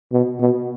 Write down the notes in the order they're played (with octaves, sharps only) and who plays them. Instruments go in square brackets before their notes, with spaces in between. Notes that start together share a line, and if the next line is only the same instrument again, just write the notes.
[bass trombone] B2
B2